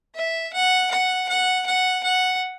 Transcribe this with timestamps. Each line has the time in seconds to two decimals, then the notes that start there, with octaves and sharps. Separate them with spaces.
0.15 E5
0.53 F#5
0.91 F#5
1.29 F#5
1.66 F#5
2.04 F#5